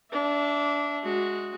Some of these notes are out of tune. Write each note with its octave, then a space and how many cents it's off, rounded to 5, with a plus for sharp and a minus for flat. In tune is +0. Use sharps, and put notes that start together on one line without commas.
D4 -20 E5 +0
G#3 +0 F#4 -10